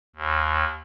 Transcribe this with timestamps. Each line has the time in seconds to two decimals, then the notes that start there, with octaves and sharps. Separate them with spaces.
0.16 D#2